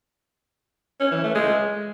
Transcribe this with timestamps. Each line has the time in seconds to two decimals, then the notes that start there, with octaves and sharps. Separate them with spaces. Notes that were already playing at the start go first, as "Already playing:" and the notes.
1.00 C#4
1.12 E3
1.23 A3
1.35 G#3